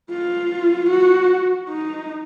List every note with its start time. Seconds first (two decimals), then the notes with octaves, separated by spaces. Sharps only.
0.11 F4
0.90 F#4
1.69 D#4